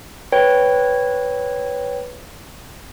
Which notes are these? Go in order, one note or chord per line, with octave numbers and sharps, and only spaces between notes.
B4 C#5 G5